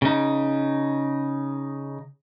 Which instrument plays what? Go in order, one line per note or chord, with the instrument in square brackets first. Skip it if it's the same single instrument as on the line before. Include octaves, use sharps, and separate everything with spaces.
[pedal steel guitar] C#3 D#4